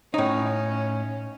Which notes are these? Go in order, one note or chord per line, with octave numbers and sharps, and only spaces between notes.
A2 C#4 D#4